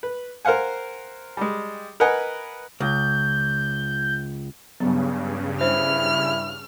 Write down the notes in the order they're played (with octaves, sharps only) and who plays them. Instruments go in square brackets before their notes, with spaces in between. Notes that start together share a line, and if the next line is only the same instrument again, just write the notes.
[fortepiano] B4
A#4 C5 F5 F#5 G#5
G3 G#3
A#4 B4 D#5 F#5 G#5
[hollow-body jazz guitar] C#2 [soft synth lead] G6
[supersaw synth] G2 C#3 [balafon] F#3 B3
[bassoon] E4 [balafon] C5 [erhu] F6